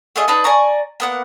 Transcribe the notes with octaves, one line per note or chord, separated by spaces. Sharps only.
A3 F4 G#4 D#5
D4 D#4 B4 A5
D5 G#5 A#5 C#6
A#3 B3 F#5